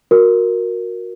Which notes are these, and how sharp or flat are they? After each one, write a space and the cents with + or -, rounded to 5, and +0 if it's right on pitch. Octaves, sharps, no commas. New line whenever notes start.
F#4 -20 A#4 +0